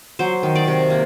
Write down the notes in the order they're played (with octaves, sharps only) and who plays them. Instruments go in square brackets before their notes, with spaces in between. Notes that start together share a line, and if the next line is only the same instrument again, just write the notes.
[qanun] F#3 C5
D#3
D5
C3
A#3